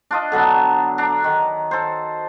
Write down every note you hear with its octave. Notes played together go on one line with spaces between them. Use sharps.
D4 F4 D#5
D3 F#3 B3
D4 A#5
D#3
A4 C5